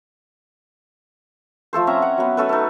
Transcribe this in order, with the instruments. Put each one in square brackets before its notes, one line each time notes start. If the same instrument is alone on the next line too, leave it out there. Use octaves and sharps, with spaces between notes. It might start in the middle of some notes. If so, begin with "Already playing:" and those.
[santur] F3 A3 A4 C5
C4 C#4 E5 A#5
F#5
F#3 B3
A3 C#4 A4 B4
D#4 A4